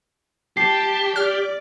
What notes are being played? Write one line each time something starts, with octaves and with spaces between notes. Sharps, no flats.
G4 A5 C7
D5 F6